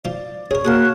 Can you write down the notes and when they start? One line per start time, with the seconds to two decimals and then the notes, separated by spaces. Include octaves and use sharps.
0.05 F3 F4 D5
0.51 G#4 A#4 C#5
0.65 A#3 F#4 G#4 F#5 A5 C6 F#6